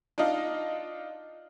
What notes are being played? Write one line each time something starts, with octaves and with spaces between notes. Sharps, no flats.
D4 D#4 F4 D#5 F5